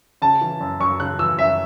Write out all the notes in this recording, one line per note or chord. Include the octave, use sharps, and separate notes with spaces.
C#3 A5
E3
F#2
F#2 C#6
C#3 F#6
E3 E6
F#2 E5